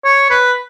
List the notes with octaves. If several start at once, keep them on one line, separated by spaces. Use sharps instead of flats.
C#5
B4